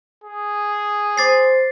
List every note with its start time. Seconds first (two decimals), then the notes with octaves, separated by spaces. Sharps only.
0.24 G#4
1.18 C5 D6 A6 C7